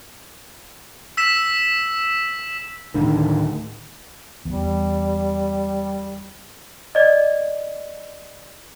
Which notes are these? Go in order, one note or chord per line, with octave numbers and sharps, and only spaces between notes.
E6 B6 E7
D1 A2 D3 D#3
E2 G3
D5 D#5